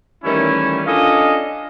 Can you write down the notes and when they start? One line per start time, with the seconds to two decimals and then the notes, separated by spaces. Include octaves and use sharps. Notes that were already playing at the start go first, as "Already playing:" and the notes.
0.24 D#3 E3 G3 A3 C#4 E4
0.86 C#4 D4 F4 A4 D#5